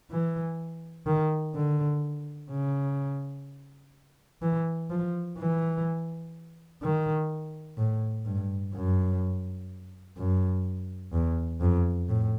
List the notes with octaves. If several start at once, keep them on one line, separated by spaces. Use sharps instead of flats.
E3
D#3
D3
C#3
E3
F3
E3
D#3
A2
G2
F#2
F#2
E2
F2
A2